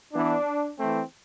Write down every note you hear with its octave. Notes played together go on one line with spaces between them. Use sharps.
E3 B3 D4
E3 A3 C4